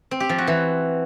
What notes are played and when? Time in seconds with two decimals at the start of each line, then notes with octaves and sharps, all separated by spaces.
0.11 C4
0.20 G4
0.29 F3
0.38 F#4
0.47 E3